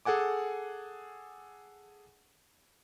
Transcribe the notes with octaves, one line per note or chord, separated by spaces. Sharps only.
G#4 A4 F#5 G#5 D6